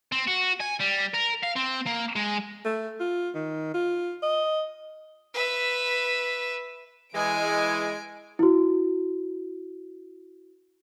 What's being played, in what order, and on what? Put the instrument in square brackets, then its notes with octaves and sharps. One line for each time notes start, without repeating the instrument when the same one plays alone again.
[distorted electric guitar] C4
F#4
G#5
G3
A#4
F5
C4
A#3
G#3
[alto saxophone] A3
F4
D#3
F4
D#5
[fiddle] B4 E5
[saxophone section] E3 G#3 [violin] G#5 D7
[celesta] E4 F#4